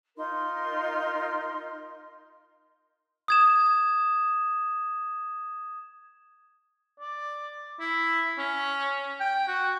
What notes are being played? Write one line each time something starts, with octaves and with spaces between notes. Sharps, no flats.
D#4 F4 A#4 C6
D#6 G#6 E7
D5
E4
C#4
G5
F#4